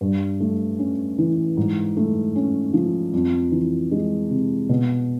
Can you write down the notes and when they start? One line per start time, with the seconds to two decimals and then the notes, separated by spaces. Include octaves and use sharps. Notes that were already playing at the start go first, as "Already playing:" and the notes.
0.01 G2
0.40 A3
0.79 C#4
1.18 E3
1.57 G#2
1.97 A3
2.36 C#4
2.74 F3
3.13 F2
3.52 E3
3.91 G#3
4.30 C3
4.69 B2